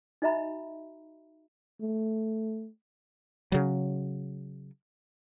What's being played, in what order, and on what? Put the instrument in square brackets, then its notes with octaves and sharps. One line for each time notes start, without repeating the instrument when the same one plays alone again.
[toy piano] D#4 F#4 D#5 E5 A#5 B5
[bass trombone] A3
[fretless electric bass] C#3 F#3